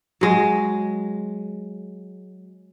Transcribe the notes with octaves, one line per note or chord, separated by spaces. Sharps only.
F#3 G#3